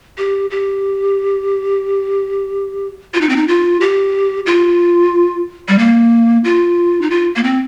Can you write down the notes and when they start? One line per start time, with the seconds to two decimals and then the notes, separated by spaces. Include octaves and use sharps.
0.18 G4
0.50 G4
3.14 F4
3.21 D#4
3.29 C4
3.36 D#4
3.48 F4
3.81 G4
4.46 F4
5.68 G3
5.78 A#3
6.44 F4
7.02 D#4
7.10 F4
7.36 A#3
7.44 C4